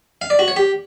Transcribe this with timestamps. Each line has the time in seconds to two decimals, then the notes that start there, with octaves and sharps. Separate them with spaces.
0.22 F5
0.30 D5
0.39 F#4
0.48 C#5
0.56 G4